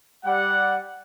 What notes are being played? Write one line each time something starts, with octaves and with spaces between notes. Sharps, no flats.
G3 F#5